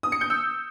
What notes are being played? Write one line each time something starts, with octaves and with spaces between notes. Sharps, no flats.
D#6
C#7
G6
E6